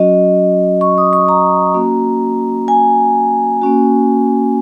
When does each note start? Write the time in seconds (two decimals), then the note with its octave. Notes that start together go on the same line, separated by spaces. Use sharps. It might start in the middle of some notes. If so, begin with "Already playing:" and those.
Already playing: F#3 C#4 F#4 D#5
0.81 C#6
0.98 D#6
1.13 C#6
1.28 A#5
1.74 A#3 C#4 F#4
2.68 G#5
3.62 A#3 C#4 F#4